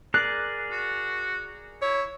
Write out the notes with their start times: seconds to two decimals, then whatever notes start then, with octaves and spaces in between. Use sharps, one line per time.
0.14 G#4 A#4 D5 F#6
0.71 F#4
1.82 E4 C#5